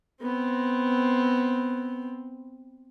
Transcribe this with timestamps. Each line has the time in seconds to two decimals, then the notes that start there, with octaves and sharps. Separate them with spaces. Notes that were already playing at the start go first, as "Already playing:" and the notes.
0.21 B3 C4